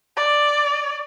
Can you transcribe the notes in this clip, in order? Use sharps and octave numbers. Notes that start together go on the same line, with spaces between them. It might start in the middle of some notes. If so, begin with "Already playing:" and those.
D5